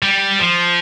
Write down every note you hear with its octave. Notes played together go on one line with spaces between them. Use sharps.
G3
F3